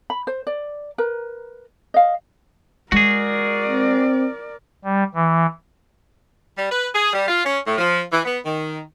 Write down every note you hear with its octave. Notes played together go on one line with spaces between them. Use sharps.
B5
C5
D5
A#4 B4
D#5 F5
G#3 F#4 G#4 A#4 D5
C4
G3
E3
G3
B4
G#4
G3
F4
C#4
A2
F3
E3
B3
D#3